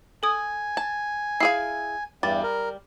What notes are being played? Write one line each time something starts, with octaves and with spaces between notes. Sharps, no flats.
A4 G#5 D#6
A5
E4 G#4 F5 C7
E2 G2 G3 A6
A#4